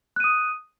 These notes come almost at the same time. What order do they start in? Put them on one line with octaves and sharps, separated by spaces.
F#6 D#7 D#6